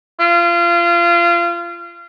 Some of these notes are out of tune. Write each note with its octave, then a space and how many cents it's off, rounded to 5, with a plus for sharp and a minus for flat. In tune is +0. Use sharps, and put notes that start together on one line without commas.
F4 -25